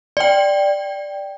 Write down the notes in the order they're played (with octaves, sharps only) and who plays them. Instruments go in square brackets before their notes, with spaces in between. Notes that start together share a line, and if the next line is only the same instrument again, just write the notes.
[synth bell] D5 G5